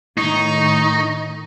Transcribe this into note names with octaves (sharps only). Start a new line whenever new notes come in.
A2 D#3 D#4 C#6